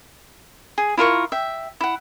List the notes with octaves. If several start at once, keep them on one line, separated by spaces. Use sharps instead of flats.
G#4
E4 F4 A#4 C#6
E5 G5
E4 F#5